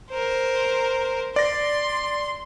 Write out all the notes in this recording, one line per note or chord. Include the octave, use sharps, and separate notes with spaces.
A#4 C5
D5 C6 A#6